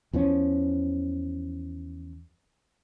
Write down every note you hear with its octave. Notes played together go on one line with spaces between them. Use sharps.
E2 E3 F3 C#4